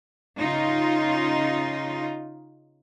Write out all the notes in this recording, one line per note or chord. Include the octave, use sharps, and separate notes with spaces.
C#3 D#4 F4